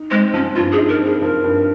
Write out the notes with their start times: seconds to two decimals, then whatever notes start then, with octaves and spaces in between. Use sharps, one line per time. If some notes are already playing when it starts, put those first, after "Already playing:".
Already playing: D#4
0.11 G#3 C4
0.34 F3 C#4
0.56 G2 F4
0.72 G#4
0.78 D#4
0.89 A#4
1.01 C4 G#4
1.22 F3 A#4
1.44 G2